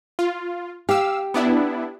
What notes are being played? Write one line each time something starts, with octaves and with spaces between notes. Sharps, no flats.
F4
G4 F5 E6
B3 D4 E4